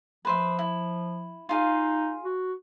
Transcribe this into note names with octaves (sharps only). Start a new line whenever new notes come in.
F3 B4 C5 E5
E4
D#4 F4 G#4 F5
F#4